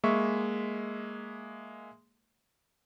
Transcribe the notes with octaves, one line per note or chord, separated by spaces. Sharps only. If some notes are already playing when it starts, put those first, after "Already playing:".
G#3 A#3 E5 C#6